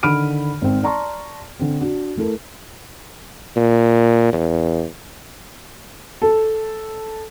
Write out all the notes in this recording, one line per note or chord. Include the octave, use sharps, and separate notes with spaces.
D3 D#3 B5 F6 D7 D#7
G#1 C4
D5 A5 A#5 C6 C#6
D3 C4
D4 F#4
A3 E4 A4 A#4
A#2
E2
A4